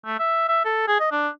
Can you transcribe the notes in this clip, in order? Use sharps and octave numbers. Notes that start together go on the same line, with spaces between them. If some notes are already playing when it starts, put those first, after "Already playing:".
A3
E5
E5
A4
G#4
D#5
D4